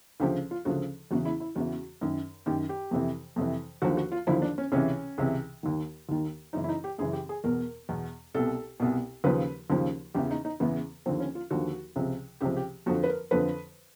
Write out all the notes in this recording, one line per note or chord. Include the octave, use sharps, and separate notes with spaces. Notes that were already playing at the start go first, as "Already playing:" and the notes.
D2 C#3 F3 G4
F4
D2 C#3 F3 F#4
E2 C#3 E3 F#4
E4
E4
E2 C#3 E3 F#4
F#2 D#3
F#2 D#3 G4
G4
F2 C3 E3
F2 C3 E3
D#2 D3 F3 F#4
F#4
F4
D#2 D3 F3 E4
D4
C#4
C#2 C3 E3 C#4
C#2 C3 E3
D#2 D#3
D#2 D#3
F#2 C#3 E3 D#4
E4
D#4
G4
F#2 C#3 E3 G#4
G4
G#4
E2 B2 A#4
E2 B2
C2 B2 A4
C2 B2
D#2 C#3 F3 B4
D#2 C#3 F3
E2 C#3 E3 G4
D#4
D#4
E2 C#3 E3 B3
D#2 D3 F3 C4
C#4
F4
D#2 D3 F3 F#4
C#2 C3 F3
C#2 C3 F3 G4
G4
F2 D3 F3 F#4
B4
A#4
F2 D3 F3 B4